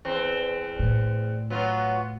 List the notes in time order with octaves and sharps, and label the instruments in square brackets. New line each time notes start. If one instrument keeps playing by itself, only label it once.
[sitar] E2 C4
[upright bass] A2
[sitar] F#3 B3 F4